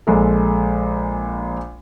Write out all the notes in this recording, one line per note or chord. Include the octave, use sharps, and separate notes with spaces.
A#1 G#3 A4